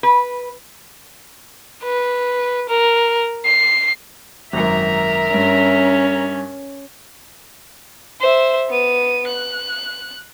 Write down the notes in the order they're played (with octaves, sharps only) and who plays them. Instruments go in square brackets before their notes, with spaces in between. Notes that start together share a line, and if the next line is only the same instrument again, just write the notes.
[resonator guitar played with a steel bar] B4
[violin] B4
A#4
C7
[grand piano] G#1 F#2 [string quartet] A#4 A#5 [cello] E5
[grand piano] G2 [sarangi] C#4
[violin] C5 E5
B3 D#7
F#6